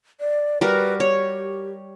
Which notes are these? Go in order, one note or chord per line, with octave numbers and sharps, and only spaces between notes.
D5
G3 F#4 A#4 B4
G4 C#5